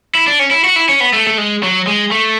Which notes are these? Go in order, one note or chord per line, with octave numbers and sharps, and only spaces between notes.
E4
D4
C#4
E4
F#4
E4
C#4
B3
A3
A3
G#3
F#3
G#3
A3